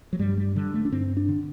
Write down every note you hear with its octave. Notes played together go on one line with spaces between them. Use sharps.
F#3
G2 G3
G3
D3 G3
A3
D4
G2 C4
D4
D3